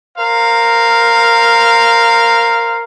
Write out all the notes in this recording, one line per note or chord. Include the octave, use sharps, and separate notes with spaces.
A#4 C5 F5